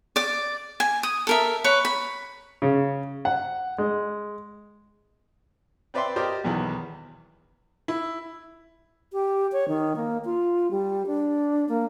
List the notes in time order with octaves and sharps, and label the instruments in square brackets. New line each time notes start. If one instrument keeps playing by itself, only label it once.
[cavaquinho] D5 D6
G#5
D#6
A4 A#4 E5
B4 C#5 C#6
B5
[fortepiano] C#3
F#5
G#3
C4 B4 D5 E5 G5 C6
G4 A#4 C5 D5 D#5
B1 E2 D#3 E3
[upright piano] E4
[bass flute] G4
C#5
D#3
A#3
F4
G3
D4
A#3